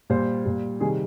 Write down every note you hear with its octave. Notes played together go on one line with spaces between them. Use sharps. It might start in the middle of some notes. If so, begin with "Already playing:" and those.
A#2 G3 C5
A#2 G3
C3 D#3 G3 G#4